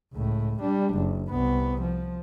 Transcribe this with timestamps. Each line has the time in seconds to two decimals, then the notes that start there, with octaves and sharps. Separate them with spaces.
0.13 C#2 A2
0.60 G3 D4
0.94 F#1
1.31 C2 B3
1.81 F3